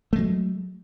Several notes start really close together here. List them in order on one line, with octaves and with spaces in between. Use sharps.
A3 G#3 F#3